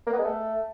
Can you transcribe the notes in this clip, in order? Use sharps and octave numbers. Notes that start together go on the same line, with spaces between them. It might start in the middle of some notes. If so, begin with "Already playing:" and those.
A#3
B3
G#3
A3